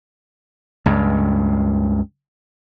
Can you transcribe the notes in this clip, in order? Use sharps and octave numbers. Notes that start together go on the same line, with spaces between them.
C#2 G2